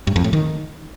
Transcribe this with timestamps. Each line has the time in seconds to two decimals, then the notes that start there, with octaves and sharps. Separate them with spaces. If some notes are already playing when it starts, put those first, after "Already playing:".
0.07 G2
0.16 F2
0.24 A2
0.33 D#3